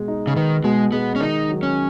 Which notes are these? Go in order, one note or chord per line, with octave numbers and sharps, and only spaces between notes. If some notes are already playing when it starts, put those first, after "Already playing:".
Already playing: B2 G#3
D#4
C#3
D#3 B4
B2 G#3
G#3 B3
C#4
D#3 D#4
F#3
C#4